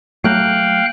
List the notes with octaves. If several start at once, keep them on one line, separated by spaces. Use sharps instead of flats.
F#3 A3 A#3 F5 G5 F#6